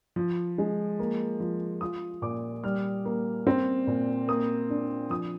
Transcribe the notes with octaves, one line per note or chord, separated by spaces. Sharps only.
F3
G#3
A#3
F3
F4 D#6
A#2 D6
G3 F6
A#3
C4
A#2
A#3 D#6
D4
F3 D#6